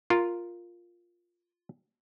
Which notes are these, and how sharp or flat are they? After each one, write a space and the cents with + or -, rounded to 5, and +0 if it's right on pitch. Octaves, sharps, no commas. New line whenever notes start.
F4 +0 A#4 +0